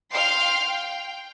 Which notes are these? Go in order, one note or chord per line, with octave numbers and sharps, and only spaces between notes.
F5 G5 C6 F6 C7
G5